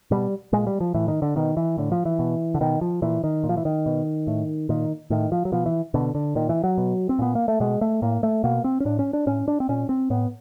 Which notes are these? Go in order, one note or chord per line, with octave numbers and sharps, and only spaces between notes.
B2 G3
A#2 G#3
G3
F3
A2 E3
D#3
D3
B2 D#3
E3
A2 D3
F3
E3
B2
D3
B2 D#3
F3
A#2 E3
D#3
A#2
F3
E3
D#3
B2
A2
A#2 D#3
A2 D#3
F3
F#3
B2 F3
E3
B2 D3
D3
A#2 D#3
E3
F#3
B2
C4
A#2 B3
A#3
A3
B2 G#3
A3
A2 A#3
A3
B2 A#3
C4
C#4
A2 D4
C#4
D4
A2 C#4
D4
C4
A#2 C#4
C4
A2 B3